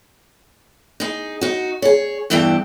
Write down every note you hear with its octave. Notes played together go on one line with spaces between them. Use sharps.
D#4 G#4
D#4 F#4
G#4 C#5
E2 G2 E3 A4 G5